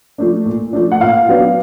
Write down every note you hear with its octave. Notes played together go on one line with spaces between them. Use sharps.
F3 A3 D4
A#2
F3 A3 D4
F#5
A#2 F5
F#3 B3 D4